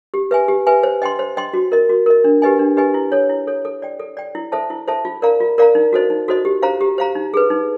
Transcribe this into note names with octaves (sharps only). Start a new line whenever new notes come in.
G4
B4 E5 G#5
G4
B4 E5 G#5
C5
D#5 G5 C6
C5
D#5 G5 C6
F#4
A#4 D#5
F#4
A#4 D#5
D4
G4 B4 D#5 G#5
D4
G4 B4 D#5 G#5
E4
A4 C#5
E4
A4 C#5
A4
D5 G5
A4
D5 G5
E4
A4 C5 E5 A5
E4
A4 C5 E5 A5
F4
A#4 D5 F5 A#5
F4
A#4 D5 F5 A#5
D#4
F#4 A4 C5 D#5
D#4
F#4 A4 C5 D#5
G4
C5 F5 A#5
G4
C5 F5 A#5
D#4
G#4 B4
D#4